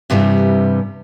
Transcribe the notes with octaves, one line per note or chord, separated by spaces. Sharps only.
G2 C3 E3 G3